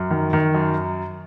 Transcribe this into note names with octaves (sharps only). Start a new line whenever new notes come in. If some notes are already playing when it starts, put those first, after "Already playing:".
Already playing: F#2
D#3
D#3
F#2